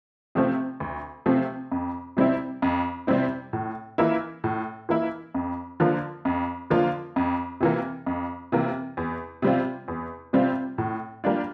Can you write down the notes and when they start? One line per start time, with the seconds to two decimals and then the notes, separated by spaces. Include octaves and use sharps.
0.35 C3 F3 A3 C4
0.80 D2
1.26 C3 F3 A3 C4
1.72 F2
2.17 C3 G3 C4 E4
2.62 F2
3.07 C3 G3 C4 E4
3.53 A2
3.98 E3 A#3 E4
4.44 A2
4.89 E3 A#3 E4
5.34 F2
5.80 D3 F3 A#3 F4
6.25 F2
6.70 D3 F3 A#3 F4
7.16 F2
7.61 C3 E3 A#3
8.06 F2
8.52 C3 E3 A#3
8.97 E2
9.42 C3 G3 C4 F4
9.88 E2
10.33 C3 G3 C4 F4
10.78 A2
11.24 G3 A#3 D4 F4